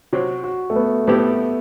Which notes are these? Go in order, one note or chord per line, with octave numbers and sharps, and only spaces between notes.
C3 F#3 C4 F#4
F#4
A3
B3
A2 G3 B3 C4 E4 G4